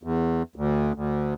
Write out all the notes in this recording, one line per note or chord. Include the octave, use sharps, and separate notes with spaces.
E2
D2
D2